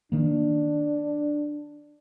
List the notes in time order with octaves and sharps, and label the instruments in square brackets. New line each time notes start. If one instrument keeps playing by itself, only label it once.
[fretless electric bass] D#3 A#3 [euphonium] D4